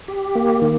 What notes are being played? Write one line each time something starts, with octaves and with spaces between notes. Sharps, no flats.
G4
A#3
D#3